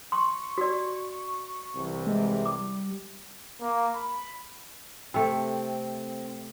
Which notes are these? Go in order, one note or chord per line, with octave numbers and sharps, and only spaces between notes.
C6 C#6
F#4 D5
C2 C3 E3
G#3
G3 D6
A#3
B5
C3 A3 C4